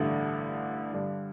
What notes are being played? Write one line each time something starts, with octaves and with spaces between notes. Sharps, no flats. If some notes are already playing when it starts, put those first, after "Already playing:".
Already playing: A1 G2 D3 A3
G2 D3 G3 D4